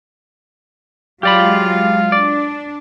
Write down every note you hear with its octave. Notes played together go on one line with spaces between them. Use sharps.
F#3 G#3 F4 G4 D5 F5 B5
D4 D5